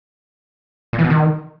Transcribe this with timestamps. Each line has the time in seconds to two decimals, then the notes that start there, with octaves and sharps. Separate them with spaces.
0.93 A#2
0.99 E3
1.04 B2
1.10 D#3